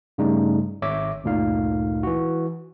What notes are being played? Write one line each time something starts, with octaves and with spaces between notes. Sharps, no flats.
G2 C#3 G3 A3 D#4
G#1 C#5 E5 D6 E6
G1 D2 A#2 D#4 F5
E3 F#4